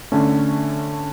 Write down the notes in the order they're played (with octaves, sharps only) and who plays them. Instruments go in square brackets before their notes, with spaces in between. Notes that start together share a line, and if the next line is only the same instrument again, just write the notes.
[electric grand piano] D3 A3 C#4